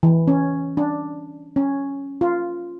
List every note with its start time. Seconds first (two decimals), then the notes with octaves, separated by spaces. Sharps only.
0.03 E3
0.28 C#4
0.77 D4
1.56 C#4
2.21 F4